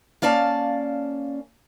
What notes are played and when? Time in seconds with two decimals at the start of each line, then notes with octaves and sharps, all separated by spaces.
0.22 A#3 C#4 D5 F5 A5